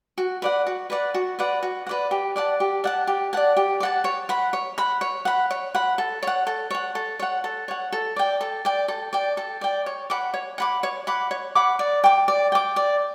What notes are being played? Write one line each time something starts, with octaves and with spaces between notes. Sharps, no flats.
F#4
B4 D5 F#5
F#4
B4 D5 F#5
F#4
B4 D5 F#5
F#4
B4 D5 F#5
G4
D5 F#5 A5
G4
D5 F#5 A5
G4
D5 F#5 A5
G4
D5
F#5 A5
C#5
F#5 B5
C#5
F#5 B5
C#5
F#5 B5
C#5
F#5 B5
A4
C#5 F#5
A4
C#5 F#5
A4
C#5 F#5
A4
C#5 F#5
A4
D5 G5
A4
D5 G5
A4
D5 G5
A4
D5 G5
C#5
F#5 B5 D6
C#5
F#5 B5 D6
C#5
F#5 B5 D6
C#5
F#5 B5 D6
D5
G5 D6
D5
G5 D6
D5